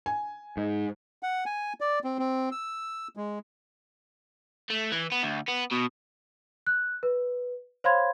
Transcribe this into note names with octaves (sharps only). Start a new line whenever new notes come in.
G#5
G#2
F#5
G#5
D5
C4
C4
E6
G#3
A3
E3
B3
D2
B3
B2
F#6
B4
C5 C#5 F5 B5 C6 G#6